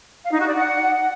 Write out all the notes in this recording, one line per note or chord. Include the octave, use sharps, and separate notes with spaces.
F5
D#4
F#4
D5
F#5